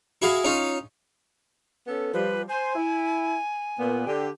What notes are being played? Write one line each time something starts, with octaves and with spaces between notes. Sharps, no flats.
E4 F#4 G#4 F5
C#4 D#4 F4
B3 C#4 A4
F3 G3 B4
C5 G#5
E4
A#2 B3
D3 G4